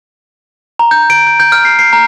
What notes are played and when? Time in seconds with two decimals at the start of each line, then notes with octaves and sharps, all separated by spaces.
0.79 A#5
0.91 G6
1.10 D7
1.27 G6
1.40 G6
1.52 F6
1.65 C7
1.79 C7
1.93 A#5